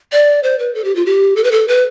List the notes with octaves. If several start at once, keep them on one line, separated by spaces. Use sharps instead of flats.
D5
C5
B4
A4
G4
F4
G4
A4
B4
A4
B4